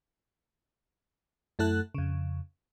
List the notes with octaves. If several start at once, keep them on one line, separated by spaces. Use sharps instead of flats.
F#2 A3 E4 A4 F#6
F2 C#3